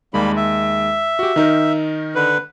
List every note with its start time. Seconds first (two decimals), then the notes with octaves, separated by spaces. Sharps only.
0.14 D#2 G3 G#3 A#3 B5
0.36 E5
1.19 F#4 G4
1.36 D#3 D#4 A#4
2.15 D3 B4